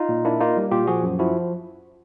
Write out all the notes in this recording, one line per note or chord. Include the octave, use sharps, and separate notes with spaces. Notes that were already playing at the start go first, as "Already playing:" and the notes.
Already playing: D#4 F4
A#2
A#3 D4 E4
A#3 D#4 F4
G3
A#2 F4 G4
F3 F#4 G#4
F#2
F3 E4 F#4